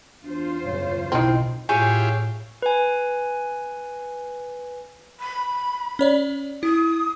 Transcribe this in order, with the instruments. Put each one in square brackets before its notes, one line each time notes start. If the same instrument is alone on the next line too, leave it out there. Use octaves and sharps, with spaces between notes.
[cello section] E2 F4 C5 [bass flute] D4
[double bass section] F#2 C#3 [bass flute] C#5
[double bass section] B1 [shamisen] D#3 C4 [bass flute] E4
[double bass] A2 [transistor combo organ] E4 F4 G4 [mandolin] G#4 C#5 [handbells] G#5 G6
[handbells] B4 G#5
[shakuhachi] B5
[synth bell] C#4 C#5 D5
[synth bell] E4 [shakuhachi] D#6